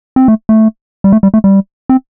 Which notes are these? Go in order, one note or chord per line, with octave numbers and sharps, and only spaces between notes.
C4
A3
A3
G3
A3
G3
A3
G3
C4